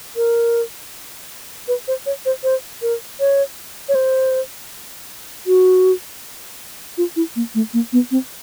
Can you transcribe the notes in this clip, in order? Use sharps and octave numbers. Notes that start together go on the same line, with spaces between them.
A#4
B4
C5
C#5
C5
C5
A#4
C#5
C#5
C5
F#4
F4
E4
A#3
A3
A#3
B3
C4